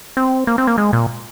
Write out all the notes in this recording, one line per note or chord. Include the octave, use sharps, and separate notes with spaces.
C4
A#3
C4
A#3
G#3
A#2